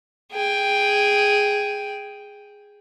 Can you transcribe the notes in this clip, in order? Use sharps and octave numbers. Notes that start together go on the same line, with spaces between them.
G#4 G5